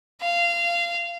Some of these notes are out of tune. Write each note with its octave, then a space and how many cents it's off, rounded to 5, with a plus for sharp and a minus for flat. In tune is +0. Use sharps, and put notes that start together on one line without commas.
F5 -20